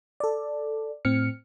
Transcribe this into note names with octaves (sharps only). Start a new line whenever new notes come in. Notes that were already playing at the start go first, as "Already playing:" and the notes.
A4 D5
A2 C4 F6 C#7